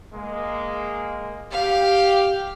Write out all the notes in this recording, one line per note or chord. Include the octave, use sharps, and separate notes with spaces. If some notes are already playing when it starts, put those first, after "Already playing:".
G#3 A#3
G4 F5